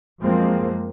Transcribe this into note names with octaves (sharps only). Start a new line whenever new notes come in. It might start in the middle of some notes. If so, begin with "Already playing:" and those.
F#2 F3 G#3 A#3 C4